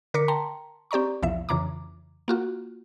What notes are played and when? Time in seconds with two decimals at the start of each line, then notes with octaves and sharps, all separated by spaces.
0.14 D3 A#4 D6 B6 C#7
0.28 G5 A5 A#5 C6
0.91 C4 G4 D5 A#5 C#6
1.23 B1 E2 F3 E5
1.49 F2 C#3 E3 A#5 D6
2.28 A#3 F4 F#4